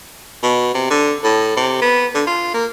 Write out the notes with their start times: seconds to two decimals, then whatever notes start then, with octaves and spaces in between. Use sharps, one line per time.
0.43 B2
0.74 C3
0.90 D3
1.24 A2
1.57 C3
1.82 B3
2.15 D3
2.27 F4
2.54 A#3